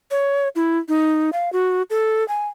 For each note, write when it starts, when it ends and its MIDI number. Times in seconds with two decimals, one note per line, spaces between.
0.11 0.49 73
0.56 0.78 64
0.89 1.30 63
1.33 1.52 77
1.53 1.82 66
1.90 2.26 69
2.28 2.47 80